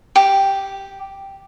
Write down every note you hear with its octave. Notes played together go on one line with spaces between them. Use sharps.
G4